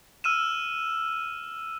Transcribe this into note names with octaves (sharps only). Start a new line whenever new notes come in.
E6 F6 D#7 E7